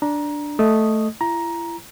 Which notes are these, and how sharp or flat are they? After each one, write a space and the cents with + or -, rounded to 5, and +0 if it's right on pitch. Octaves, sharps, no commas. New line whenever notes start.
D4 +0 A#5 +20
A3 +0 D#5 -5 D#6 +0
E4 +40 A#5 +15